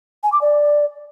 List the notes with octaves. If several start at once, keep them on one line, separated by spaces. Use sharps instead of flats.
G#5
D6
D5